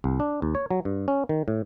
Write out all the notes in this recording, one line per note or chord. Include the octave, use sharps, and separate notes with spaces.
C2
D4
D#2
C#5
F#3
G2
C#4
D#3
A2